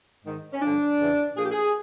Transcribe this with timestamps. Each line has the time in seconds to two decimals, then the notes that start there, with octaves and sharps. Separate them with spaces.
0.24 G#2 D#3
0.53 C#4
0.61 G2 D3 F3 D4
0.99 E2 C#3 E3
1.36 A#2 F3 G#4
1.44 G4
1.51 G#4